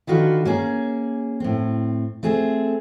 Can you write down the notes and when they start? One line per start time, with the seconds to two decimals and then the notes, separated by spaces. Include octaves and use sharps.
0.07 D3 D#3 F4 F#4 B4
0.45 A#3 C#4 G#4
1.40 A2 C4
2.23 A3 C4 G#4